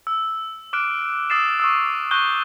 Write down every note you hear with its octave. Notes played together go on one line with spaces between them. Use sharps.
E6
D6 F6 F#6 D7
D#6 E6 A6 C7 E7
C#6 D#6 E6
C#6 F#6 G6 G7